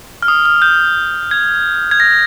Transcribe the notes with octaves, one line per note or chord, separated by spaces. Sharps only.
F6
D#6
F6
G6
G#6
G#6
A#6